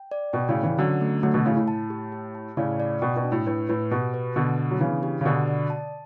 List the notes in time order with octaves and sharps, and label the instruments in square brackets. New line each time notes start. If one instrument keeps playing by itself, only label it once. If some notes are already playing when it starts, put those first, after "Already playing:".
Already playing: [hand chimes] G5
D5
[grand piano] B2 [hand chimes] G5
[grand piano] A2 C#3
[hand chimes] D5
[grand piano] C#3 E3
[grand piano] D3 F#3 [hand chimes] C#4
[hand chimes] A3
[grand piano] D3 F#3 [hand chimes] A3
[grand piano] B2 D3
[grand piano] A2 C#3 [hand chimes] E4
[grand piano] A2
[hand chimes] A5
G4
G4
A5
[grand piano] A2 C#3 [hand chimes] D5
[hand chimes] D5
[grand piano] B2 [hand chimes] G5
[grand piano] B2
[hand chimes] D4
[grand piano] A2
[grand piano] A2 [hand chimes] B4
[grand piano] A2 [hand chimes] B4
[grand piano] B2 [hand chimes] G4
[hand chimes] B4
[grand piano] B2 D3 [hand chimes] B3
[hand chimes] B3
[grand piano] F#3
[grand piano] C#3 E3 [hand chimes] D4
[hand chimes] G4
[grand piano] C#3
[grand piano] B2 D3 [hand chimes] D5
[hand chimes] D5
A5